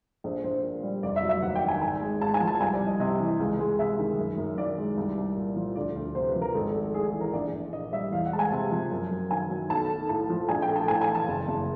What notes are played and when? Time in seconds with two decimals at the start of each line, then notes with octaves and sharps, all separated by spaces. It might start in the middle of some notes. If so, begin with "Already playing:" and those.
0.24 A#1 C5
0.44 A#1 C5
0.63 A#2
0.83 G3
1.03 F1 D5
1.16 E5
1.23 F#3
1.29 E5
1.42 D#2 F#5
1.55 G5
1.62 D#3
1.68 G#5
1.82 G#1 G#5
2.01 G#3
2.21 G#2 A5
2.34 G#5
2.40 F3
2.47 A5
2.60 C2 G#5
2.73 D5
2.80 C2
2.87 D#5
3.00 C3 D#5
3.19 E3
3.40 C#2
3.59 G#3
3.79 C3 E5
3.99 D#3
4.19 F#2
4.38 F#2
4.57 D#3 D5
4.77 G#3
4.97 C2
5.17 C2
5.36 A#2
5.56 F3
5.75 D2 D5
5.96 D2
6.15 C3 C5
6.28 B4
6.35 F3
6.41 A#4
6.54 G#1 A4
6.74 A3
6.94 G#2 G#4
7.07 G#4
7.14 E3
7.21 A#4
7.33 A#1 D5
7.53 A#1
7.73 A#2 D#5
7.93 G3 E5
8.12 E2 F5
8.26 F#5
8.32 G#3 A5
8.39 G#5
8.52 C3
8.72 F3
8.91 F#2
9.11 F#2
9.31 D#3 G#5
9.50 F#3
9.70 B1 A5
9.90 A3
10.09 A2 A5
10.30 F3
10.49 A#1 G#5
10.62 G5
10.69 A3
10.76 A5
10.88 A2 G#5
11.01 G#5
11.08 E3
11.15 A5
11.28 F#1
11.48 F#1